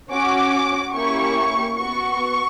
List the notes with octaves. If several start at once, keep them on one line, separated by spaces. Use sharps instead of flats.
C#4 F#4 D6
A#3 C#4 E4 G4 C#6
B3 F#4 C#6